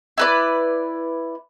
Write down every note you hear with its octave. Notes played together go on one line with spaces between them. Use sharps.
E4 B4 D5